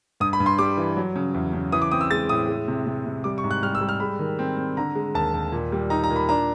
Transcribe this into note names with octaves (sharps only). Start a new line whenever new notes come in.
G2 D#6
B5
G2
C6
G3 D6
E3
F#3
C#3
E2
C#3
E3 D#6
D6
C4 D#6
E6
G#3 A6
A2 D#6
G#3
C3
C3
C3
G3 D6
C#6
G#2
F#6
G3 F6
E6
G3
F6
G#3 B5
D#3
C4
C4
D3 A#5
G#3
D#2 A5
D#2
A#2
G3
D#4 A#5
A#5
A#2
B5
D4 A#5